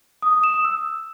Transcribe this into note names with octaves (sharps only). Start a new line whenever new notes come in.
D#6
D#6
E7
D#6
E6